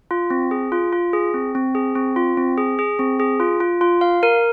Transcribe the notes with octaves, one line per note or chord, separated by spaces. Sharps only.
F4
C4
G#4
F4
F4
G#4
C4
C4
G#4
C4
F4
C4
G#4
G#4
C4
G#4
F4
F4
F4
F5
A#4